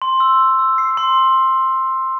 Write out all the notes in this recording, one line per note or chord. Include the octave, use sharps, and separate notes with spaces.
C6
E6
C6
E6
C7
C6